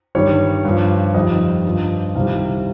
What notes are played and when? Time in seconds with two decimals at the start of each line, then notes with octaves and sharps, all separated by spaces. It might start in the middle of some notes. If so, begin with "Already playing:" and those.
0.15 G2 D#3 G3 C#5
0.65 G2 F3
1.14 F2 D#3 G3 D#5
1.65 G2 F3
2.15 C2 C3 D#3 G3 F5